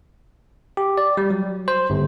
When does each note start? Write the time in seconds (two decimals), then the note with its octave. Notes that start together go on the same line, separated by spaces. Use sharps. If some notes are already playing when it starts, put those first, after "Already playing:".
0.77 G4
0.98 D5
1.17 G3
1.30 F#3
1.68 C5
1.90 G1